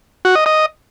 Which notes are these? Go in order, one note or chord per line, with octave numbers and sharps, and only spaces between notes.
F#4
D#5
D#5